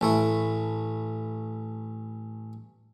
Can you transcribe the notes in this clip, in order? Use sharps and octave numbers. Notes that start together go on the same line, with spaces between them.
A1 A3 E4